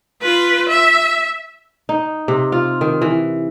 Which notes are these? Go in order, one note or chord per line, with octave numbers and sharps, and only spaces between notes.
F4 B4
E5
D#4
C3
F4
D#3
E3